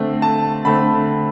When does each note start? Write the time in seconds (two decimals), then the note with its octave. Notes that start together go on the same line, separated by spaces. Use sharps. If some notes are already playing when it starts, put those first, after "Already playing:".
Already playing: D3 A3 C4
0.22 A5
0.65 D3 A3 C4 B5